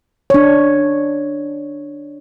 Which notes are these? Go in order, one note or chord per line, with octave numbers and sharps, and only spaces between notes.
D4 C#5